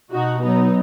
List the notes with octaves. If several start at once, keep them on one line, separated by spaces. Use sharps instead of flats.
B2 D#4 F#4
F#3 B3 D#4